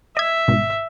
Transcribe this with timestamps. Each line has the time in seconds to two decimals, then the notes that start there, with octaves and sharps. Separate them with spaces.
0.17 D#5 E5 G#6
0.48 G#1 B2